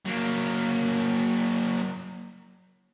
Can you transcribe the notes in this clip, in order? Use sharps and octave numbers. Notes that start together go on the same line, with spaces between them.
F#3 A#3